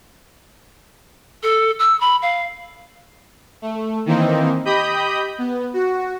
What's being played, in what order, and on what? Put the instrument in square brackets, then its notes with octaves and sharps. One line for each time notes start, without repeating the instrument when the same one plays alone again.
[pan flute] A4
E6
B5
F5
[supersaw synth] A3
D#3 E3 A#3 C4 D#4
G4 D#5 B5 D#6 G6
B3
F#4